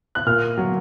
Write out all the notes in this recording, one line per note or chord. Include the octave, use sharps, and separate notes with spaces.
F#6
A#2 F6
F#3